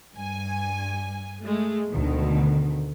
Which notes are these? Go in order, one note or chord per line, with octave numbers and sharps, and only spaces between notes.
G2 G#5
G#3 A3
D2 B2 D#3